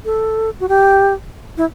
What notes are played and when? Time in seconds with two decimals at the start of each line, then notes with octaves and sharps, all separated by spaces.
0.05 A4
0.60 F#4
0.69 G4
1.57 E4